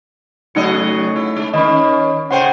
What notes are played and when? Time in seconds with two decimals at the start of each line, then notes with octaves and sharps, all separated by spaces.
0.55 C#3 F#3 A3 D#4 D#5 C#7
1.16 E4
1.36 G#3
1.54 D#3 C#4 D#5 B5
2.31 A2 C#3 C5 F#5 G5